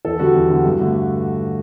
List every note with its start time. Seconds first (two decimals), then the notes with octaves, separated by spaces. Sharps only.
0.05 E2 A4
0.19 D3 G3 F#4
0.35 E2
0.50 D3 G3
0.65 G2
0.80 D3 A3